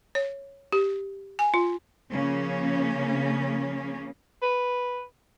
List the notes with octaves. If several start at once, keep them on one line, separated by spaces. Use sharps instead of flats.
C#5
G4
G#5
F4
C#3 F3 A#3 C#4
B4